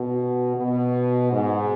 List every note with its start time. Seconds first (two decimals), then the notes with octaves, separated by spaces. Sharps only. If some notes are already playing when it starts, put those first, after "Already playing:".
Already playing: B2
0.56 B2
1.31 G#2